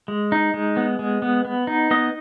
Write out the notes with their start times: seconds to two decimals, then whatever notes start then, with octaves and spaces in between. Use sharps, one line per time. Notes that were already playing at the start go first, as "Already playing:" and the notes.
0.08 G#3
0.32 D#4
0.54 G#3
0.77 B3
0.99 G#3
1.22 B3
1.45 B3
1.67 D#4
1.91 B3 D#5